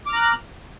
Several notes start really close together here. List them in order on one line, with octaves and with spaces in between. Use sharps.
D6 F6 A#5 F#6